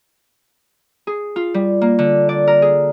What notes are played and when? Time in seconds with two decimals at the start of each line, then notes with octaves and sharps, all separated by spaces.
1.07 G#4
1.36 F4
1.54 G3
1.81 A#3
1.99 D3
2.29 D5
2.47 A#4
2.62 G#4